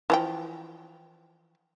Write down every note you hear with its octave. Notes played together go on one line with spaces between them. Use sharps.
E3 F3 G5